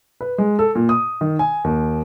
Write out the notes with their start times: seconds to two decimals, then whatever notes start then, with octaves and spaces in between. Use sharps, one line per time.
0.21 B4
0.38 G#3
0.59 A4
0.75 A#2
0.89 D#6
1.21 D#3
1.39 G#5
1.64 D#2